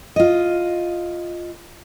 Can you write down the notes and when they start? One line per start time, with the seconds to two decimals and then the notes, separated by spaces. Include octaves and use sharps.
0.16 F4 D#5